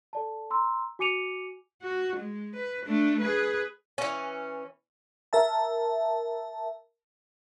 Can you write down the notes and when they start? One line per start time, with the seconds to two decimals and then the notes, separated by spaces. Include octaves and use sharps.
0.13 A4 D5 A5
0.50 A#5 C6 E6
0.99 F#4 G#5 D6 C#7 D#7 F7
1.82 F#4
2.16 G#3
2.56 B4
2.86 A3 D4
3.21 G#4 B4
3.98 E3 C#4
5.33 A#4 E5 A5